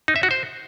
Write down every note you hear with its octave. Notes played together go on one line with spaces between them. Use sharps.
D#4
E5
F#4
C5